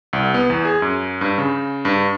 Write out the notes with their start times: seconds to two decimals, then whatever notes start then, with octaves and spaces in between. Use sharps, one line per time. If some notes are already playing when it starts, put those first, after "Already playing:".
0.13 C2
0.34 B3
0.50 E2
0.65 G#4
0.82 F#2
1.21 G2
1.38 C#3
1.85 G2